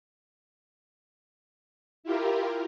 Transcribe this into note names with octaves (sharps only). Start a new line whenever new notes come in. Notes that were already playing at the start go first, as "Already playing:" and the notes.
E4 F4 G4 A#4